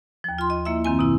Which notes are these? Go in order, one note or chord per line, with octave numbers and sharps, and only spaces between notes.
D#2 F3
F4 C6
D#5
A#3 E4 E5
F#2 D#3 C4 G#5
B2 E4